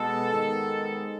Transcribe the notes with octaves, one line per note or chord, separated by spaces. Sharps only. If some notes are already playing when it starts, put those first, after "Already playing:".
Already playing: B2 G#3 B3 A4
G#2 D#3 G#3 B3